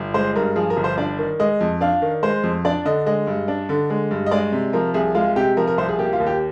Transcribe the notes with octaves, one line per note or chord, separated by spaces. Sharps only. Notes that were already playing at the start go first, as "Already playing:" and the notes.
Already playing: G1
G#3 C5
G2 A#4
F3 G#4
A#4
G1
C5
D4 D5
D#3
G#3 D#5
F2
D4 F5
D#3
G#3 C5
F2
D4 D5
D3 D#5
G#3 D#5
G2
D4
D3
G#3
G2
D#5
G#3 D5
C3
F3 A#4
C2 G#4
G#3 F4
C3 G4
F3 A#4
A#4
C2 C5
G#4
A#3 G4
F4
D#2
G4